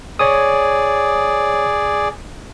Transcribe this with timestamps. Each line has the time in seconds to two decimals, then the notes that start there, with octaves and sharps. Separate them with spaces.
0.19 G#4 C#5 D5 D#6